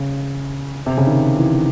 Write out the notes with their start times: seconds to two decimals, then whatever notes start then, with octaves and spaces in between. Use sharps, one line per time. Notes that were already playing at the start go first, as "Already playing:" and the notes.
Already playing: C#3
0.86 C3
0.97 C#3
1.07 D#3
1.37 E3